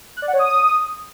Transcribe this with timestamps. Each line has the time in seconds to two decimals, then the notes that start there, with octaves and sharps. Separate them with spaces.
0.16 F#6
0.22 D5
0.28 F#5
0.33 C#5
0.39 D#6